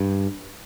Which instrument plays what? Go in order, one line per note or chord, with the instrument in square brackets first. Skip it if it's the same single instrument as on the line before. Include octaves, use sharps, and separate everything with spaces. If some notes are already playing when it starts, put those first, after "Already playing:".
Already playing: [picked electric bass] G2